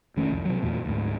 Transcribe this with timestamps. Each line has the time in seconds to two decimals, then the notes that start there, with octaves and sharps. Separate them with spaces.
0.16 F1 D#3 A3 C#4
0.30 C2 F2
0.45 C3 F#3
0.62 E2 A#2 A3
0.85 D2 G#2